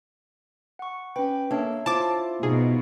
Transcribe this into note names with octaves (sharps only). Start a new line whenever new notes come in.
F#5 C#6
C#4 B4 G5
A#3 D4 A4 C#5 E5
E4 F4 C5 A5 D6
B2 D#4 G#4